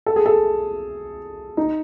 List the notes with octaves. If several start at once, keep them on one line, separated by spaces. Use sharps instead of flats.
A4
G#4
A4
D#4